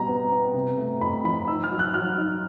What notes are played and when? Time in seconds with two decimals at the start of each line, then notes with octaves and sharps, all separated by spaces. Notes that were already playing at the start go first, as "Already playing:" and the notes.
Already playing: B2 G3 A#5
0.08 B3
0.32 B3
0.54 C3
0.78 A3
1.01 F2 B5
1.24 F3 B5
1.47 D#4 E6
1.64 F6
1.71 F#3
1.79 F#6
1.94 F#3 F6
2.18 D#4